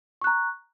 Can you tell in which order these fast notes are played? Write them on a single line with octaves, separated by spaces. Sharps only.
C#6 F#6 A#5